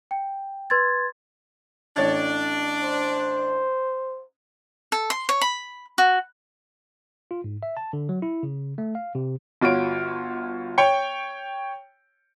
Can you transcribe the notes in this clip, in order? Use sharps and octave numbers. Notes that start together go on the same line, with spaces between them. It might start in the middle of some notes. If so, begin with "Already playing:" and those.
G5
B4 C6 G#6 A6
A1 D4 C#5 A6
C5
A4
C6
C#5
B5
F#4
F4
G#2
E5
A5
D3
F#3
E4
C#3
A3
F5
C3
G1 F4 F#4 C#5 D7
C#5 G5 C#7